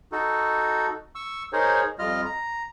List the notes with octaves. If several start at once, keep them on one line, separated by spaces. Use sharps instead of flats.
D#4 F#4 A4
C#6 E6
D#4 G#4 A#4 C5 C#5
F2 G3 F4 D#5 F6
A#5